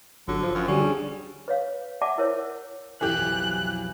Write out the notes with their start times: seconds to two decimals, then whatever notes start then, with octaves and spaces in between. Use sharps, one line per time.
0.28 G1 D3 F#3
0.43 F3 C5
0.55 F#2 F3
0.68 D3 G3 C#4 F#4
0.80 D4 G4 G#4
1.48 B4 C#5 F5
2.01 D5 E5 F#5 G#5 A5 D6
2.18 E4 A#4 C5 C#5
3.01 B1 F2 E3 G4 F#6